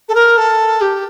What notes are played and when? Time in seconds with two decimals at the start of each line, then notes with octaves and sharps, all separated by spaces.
0.08 A4
0.14 A#4
0.37 A4
0.81 G4